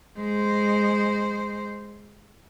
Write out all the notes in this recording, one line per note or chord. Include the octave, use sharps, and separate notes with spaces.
G#3 C5